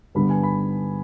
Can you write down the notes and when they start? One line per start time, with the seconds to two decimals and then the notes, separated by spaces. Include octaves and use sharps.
0.15 G2 D3 G3 B3 B5
0.30 G#5
0.43 B5